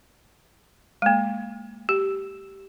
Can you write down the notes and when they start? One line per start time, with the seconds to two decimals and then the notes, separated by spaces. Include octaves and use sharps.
1.02 G#3 A#3
1.89 G4